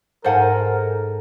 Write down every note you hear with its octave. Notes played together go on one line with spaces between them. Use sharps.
G#2 A4 A#4 C5 F#5 G#5